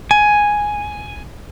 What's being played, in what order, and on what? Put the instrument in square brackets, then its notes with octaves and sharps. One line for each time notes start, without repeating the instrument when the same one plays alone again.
[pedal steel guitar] G#5